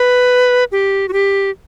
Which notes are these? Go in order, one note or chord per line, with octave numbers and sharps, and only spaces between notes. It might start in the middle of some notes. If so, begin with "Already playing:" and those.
Already playing: B4
G4
F#4
G4